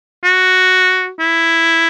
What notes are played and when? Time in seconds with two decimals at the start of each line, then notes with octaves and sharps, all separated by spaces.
0.24 F#4
1.20 E4